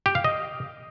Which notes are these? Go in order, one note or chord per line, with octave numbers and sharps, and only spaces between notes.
G4
F5
D#5